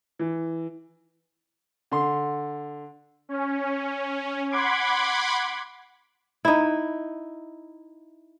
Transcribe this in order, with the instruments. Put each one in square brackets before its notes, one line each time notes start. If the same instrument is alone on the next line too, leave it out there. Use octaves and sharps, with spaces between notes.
[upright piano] E3
[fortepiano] D3 C6
[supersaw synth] C#4
F#5 B5 C6 D6 G#6
[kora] D#4 E4